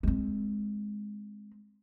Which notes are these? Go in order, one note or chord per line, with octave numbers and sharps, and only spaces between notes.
G#3 C4